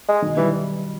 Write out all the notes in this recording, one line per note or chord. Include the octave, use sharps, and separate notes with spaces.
G#3
B2 D#3
D#3 E3 G3